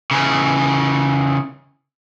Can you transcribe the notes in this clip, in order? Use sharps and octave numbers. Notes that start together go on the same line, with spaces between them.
C#3 E3